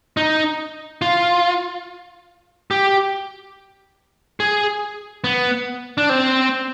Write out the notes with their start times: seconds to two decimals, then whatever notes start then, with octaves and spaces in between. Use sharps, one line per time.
0.17 D#4
1.02 F4
2.71 G4
4.40 G#4
5.24 B3
5.98 D4
6.09 C4